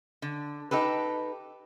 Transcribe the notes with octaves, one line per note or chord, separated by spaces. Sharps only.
D3
D#4 G4 A4 B4